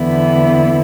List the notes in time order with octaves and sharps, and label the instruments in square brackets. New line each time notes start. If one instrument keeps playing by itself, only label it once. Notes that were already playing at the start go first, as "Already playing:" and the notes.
Already playing: [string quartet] E2 D3 B3 E4